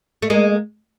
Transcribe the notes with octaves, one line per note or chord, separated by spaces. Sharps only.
A3
G#3 A#3